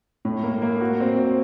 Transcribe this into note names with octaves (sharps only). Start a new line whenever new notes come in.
A2
A#3
A#3
F#4
C4
C4